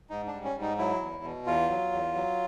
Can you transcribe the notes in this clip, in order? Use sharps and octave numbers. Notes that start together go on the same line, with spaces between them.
G#2 D#4
D4
G3
C#4
G#2
D#4
F#3 E4
E2
B2
E2 F4
F#3
E2
F#3